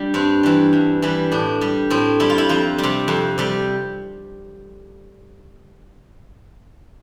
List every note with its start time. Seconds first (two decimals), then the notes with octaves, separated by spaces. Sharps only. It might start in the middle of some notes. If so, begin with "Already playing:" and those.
Already playing: G3 D4
0.14 G2 C4
0.43 E3 G3
0.73 G2
1.02 E3 G3
1.32 A2 D4
1.61 G3
1.90 A2 C4
2.20 G3 E4
2.30 F4
2.38 E4
2.49 F2 F4
2.78 C3 G3
3.08 F2
3.38 C3 G3